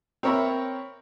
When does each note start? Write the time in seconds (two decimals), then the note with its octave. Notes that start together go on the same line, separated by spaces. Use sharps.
0.23 C4 A#4 C#5 E5 B5